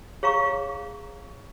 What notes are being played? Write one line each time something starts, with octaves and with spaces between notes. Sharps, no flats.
G#4 C#5 F5 A#5 C#6